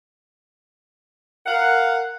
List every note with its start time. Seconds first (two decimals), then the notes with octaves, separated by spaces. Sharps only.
1.46 A#4 F5 F#5